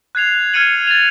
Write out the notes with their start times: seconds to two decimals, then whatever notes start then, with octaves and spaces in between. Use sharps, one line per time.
0.15 F#6 G#6 C7 F7
0.53 F6 G#6 C#7 D#7 F#7
0.87 A6 F7